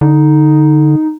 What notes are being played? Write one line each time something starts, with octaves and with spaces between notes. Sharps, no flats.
D3 D#4